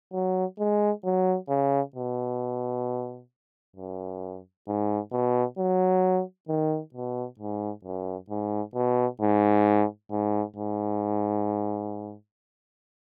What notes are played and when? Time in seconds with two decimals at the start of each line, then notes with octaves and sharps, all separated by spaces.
0.13 F#3
0.59 G#3
1.04 F#3
1.49 C#3
1.95 B2
3.76 F#2
4.67 G#2
5.12 B2
5.58 F#3
6.48 D#3
6.94 B2
7.39 G#2
7.84 F#2
8.30 G#2
8.75 B2
9.21 G#2
10.11 G#2
10.56 G#2